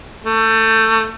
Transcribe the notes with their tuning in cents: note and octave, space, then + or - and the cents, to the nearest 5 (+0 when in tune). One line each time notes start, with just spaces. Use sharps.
A3 +25